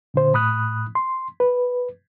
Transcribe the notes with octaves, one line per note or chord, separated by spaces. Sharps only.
A#2 D3 C5
A2 B5 D#6 F#6
C6
B4